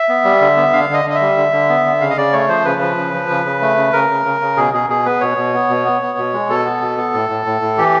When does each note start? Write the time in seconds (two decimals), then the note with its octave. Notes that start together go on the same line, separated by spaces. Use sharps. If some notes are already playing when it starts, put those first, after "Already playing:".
Already playing: E5
0.09 B3
0.25 G3
0.41 D3
0.57 B3
0.73 D3 F5
0.90 D3 D#5
1.05 D3
1.10 D#5
1.15 E5
1.21 G3
1.37 D3
1.53 D3
1.69 B3
1.85 D3
2.01 C#3 F5
2.10 D#5
2.17 C#3 D5
2.33 A3 C#5
2.49 F3 C5
2.65 C#3 B4
2.81 F3
2.97 C#3
3.14 F3
3.29 C#3
3.45 C#3
3.62 A3
3.77 C#3
3.93 C#3 A#4
4.10 C#3
4.26 C#3
4.42 C#3
4.57 B2 G#4
4.73 B2 G#4
4.89 B2 G#4
5.06 B3 B4
5.21 B2 C#5
5.37 B2
5.54 B3
5.70 B2
5.85 B3
6.02 B3
6.18 B2
6.34 G#3
6.49 B2 A4
6.65 B3
6.81 B2
6.97 B3
7.14 A2
7.30 A2
7.46 A2
7.62 A2
7.78 E3 G4